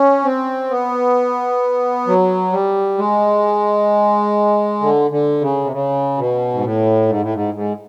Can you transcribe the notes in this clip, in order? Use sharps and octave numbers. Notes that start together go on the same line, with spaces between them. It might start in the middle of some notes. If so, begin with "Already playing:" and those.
Already playing: C#4
C4
B3
F#3
G3
G#3
D3
D3
C#3
C3
C#3
B2
G#2
A2
G#2
A2
G#2
G#2